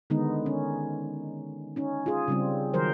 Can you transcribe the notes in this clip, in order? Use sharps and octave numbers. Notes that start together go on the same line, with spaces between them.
D3 D#3 G#3 B3 D#4
C#4
C#4 D#4
F4 G#4
C#3 G3 C4
D#3 F#3 A#4 C5